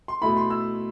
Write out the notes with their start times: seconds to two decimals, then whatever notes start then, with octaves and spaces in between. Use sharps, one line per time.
0.08 C6
0.21 B2 A3 E4 B5
0.37 C6
0.50 E6